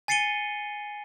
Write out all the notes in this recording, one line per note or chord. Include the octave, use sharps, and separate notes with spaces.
G#5 A6 C7 C#7 D#7 G7